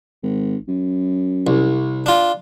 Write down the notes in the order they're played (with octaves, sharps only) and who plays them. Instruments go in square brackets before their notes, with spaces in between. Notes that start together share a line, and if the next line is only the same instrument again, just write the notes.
[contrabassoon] G#1
F#2
[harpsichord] C2
D4 F4